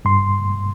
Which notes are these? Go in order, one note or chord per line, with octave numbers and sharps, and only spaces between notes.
G2 C6